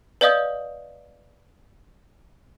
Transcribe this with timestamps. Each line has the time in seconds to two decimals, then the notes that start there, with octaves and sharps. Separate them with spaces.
0.21 B4 D5 D#5 F5 D#6 G6